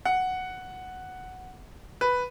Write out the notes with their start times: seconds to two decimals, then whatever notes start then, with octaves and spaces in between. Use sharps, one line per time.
0.05 F#5
2.01 B4